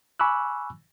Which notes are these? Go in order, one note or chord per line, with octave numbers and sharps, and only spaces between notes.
G#5 B5 C#6 D6 E6 F#6